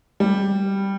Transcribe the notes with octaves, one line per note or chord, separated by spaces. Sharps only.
G3